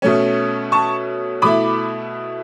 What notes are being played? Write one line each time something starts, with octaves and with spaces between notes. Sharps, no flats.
B2 A3 C#4
A5 C#6
B2 A3 E4 B5 D6